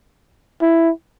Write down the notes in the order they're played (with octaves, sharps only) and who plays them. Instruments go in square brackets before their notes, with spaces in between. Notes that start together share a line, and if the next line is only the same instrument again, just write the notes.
[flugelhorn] E4